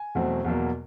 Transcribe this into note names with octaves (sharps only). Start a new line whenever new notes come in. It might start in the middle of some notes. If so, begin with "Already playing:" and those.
Already playing: G#5
E2 B2 F#3 A3 C4
E2 B2 F#3 A#3